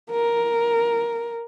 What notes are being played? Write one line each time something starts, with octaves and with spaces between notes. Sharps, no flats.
A#4